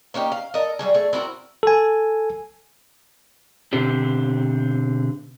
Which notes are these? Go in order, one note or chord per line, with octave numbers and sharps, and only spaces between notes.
A#3 C#4 D#4 G4
F5
A4 A#4 D#5
F#3 G3 G#4
A3 G#4
C4 E4 F#4 A#4
A4 G#5
B2 D3 C4 G4